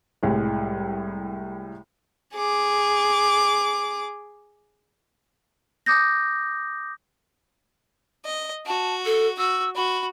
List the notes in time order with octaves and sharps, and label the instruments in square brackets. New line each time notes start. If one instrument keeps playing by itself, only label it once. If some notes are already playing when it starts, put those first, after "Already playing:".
[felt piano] C2 A2 G#3
[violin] G#4 D6
[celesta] D6 D#6 G6 A#6
[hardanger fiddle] D#5
[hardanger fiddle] F#4 [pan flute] A5
[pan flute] A4
[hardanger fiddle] F#4 [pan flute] E6
[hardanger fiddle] F#4 [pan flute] B5